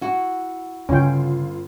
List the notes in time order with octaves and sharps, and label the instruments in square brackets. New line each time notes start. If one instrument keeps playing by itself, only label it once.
[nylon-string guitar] E4 F#4
[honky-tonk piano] G1 F4 [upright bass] C#3 [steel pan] C#4 G5